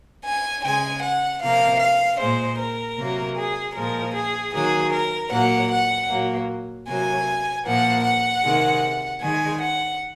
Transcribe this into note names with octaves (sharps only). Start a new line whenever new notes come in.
G#5
C#3 G#3 G#5
F#5
C3 F3 A#3 F5
F5
A#2 G#3 C5
A#4
C3 F#3 A#3
G#4
A#2 F3 G#3 A#4
G#4
D#3 F#3 A#3 G#4
A#4
A#2 F#3 A#3 F#5
F#5
A#2 F#3 A#3
C3 F#3 A#3 G#5
A#2 F3 A#3 F#5
F#5
C3 D#3 G#3
D#3 G#3 G#5
F#5